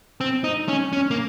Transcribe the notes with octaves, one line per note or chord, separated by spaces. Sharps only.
C4
D#4
C#4
C#4
A#3